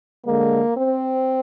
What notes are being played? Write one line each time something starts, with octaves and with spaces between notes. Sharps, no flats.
D3 G#3 A#3
C4